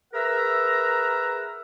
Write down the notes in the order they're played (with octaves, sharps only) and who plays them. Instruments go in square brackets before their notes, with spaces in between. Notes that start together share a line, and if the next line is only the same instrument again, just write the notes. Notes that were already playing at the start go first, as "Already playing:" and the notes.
[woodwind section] G#4 A#4 B4 E5 F#5 A#5